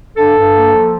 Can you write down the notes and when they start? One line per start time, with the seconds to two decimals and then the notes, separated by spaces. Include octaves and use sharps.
0.16 G2 A4
0.35 G2
0.54 A#3
0.73 F3